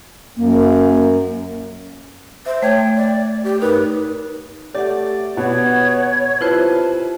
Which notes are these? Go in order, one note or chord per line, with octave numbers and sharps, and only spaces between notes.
F#2 A#3
C5 E5
A3 C#5 G5 G#6
D5
G4
G2 D#4 A#4 B4
A3 G4 D5 F#5
B2 B3 C#5
C3 E4 F4 B4 C5 A5